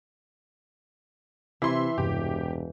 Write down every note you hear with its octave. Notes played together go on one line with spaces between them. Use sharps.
C3 E3 E5 B5 C6
E1 E2 G2 C3 G4